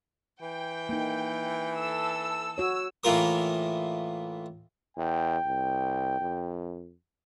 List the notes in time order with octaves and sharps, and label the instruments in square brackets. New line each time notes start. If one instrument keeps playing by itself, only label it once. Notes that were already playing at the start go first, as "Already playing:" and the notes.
[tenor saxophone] E3 [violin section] G5
[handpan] A#3 D#4
[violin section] A4 E6
[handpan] F#4 C#5 [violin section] E6
[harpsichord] A2 E3 A#3 F4 A#4 D#6
[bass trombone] E2 [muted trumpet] G5
[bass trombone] C2
F2